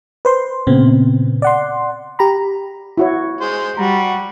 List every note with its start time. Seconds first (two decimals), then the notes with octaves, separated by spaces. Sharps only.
0.25 B4 C5 C6
0.67 A#2 C#3 B3 C4
1.42 D5 F#5 C6
2.19 G4 A#5 B5
2.98 E4 F#4 C#5
3.41 G#3 C5
3.77 G3 F#4 A#5